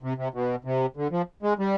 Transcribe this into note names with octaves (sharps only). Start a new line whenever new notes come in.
C3
C3
B2
C3
D3
F3
G#3
G3